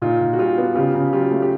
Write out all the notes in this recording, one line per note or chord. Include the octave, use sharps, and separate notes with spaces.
A#2 D#4 F4
A#2
F#4
G3 F4 G4
B3
C#3 F4 G4
C#3
F#3 F4 G4
A3
G4